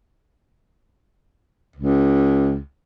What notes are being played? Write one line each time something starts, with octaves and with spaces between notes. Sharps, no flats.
C#2